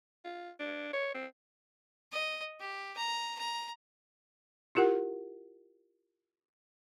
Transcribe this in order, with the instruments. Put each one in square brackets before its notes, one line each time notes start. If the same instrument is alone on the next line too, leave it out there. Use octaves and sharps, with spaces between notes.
[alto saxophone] F4
D4
C#5
C4
[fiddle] D#5
G4
A#5
A#5
[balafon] E4 F4 G4 A#4 F#5